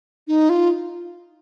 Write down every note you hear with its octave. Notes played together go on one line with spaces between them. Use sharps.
D#4
F4